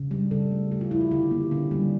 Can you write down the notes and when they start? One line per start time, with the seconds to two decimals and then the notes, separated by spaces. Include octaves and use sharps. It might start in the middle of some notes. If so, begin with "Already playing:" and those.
Already playing: C#3
0.11 G3
0.31 C#3 A4
0.51 A3
0.71 C#3 G4
0.81 F4
0.91 F3 E4
1.01 F4
1.11 D3 G4
1.31 A#3
1.51 D3 C#4
1.71 G3